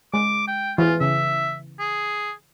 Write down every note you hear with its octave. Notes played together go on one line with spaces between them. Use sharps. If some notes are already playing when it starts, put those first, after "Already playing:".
G#3 D6
G5
E3 F4 G#4
C#3 E5
G#4